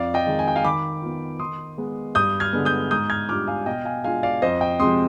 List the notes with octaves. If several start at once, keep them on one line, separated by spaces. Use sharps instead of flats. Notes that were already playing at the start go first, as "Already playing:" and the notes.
Already playing: F2 D5 F5
D#5 G5
D#3 G#3
G#5
G5
F5 G#5
D#3 B5 D6
B3 F4
D#3 C6 D#6
G#3 B3
G2 D#6 G6
F6 G#6
D3 G#3 B3
D#6 G6
G#2 D#6 G6
F6 G#6
G3 D4 F4 D6 F6
F5 G#5
B2 D#5 G5
F5 G#5
G#3 D4 F4 F5 G#5
D5 F5
F2 C5 D#5
D#5 G5
C3 F3 G#3 C4 C6 D#6